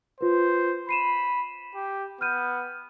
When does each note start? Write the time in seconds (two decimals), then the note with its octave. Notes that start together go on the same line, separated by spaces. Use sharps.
0.21 F4 B4 C5
0.89 B5 C7 D#7 E7
1.75 G4
2.21 B3 F6 G6 D#7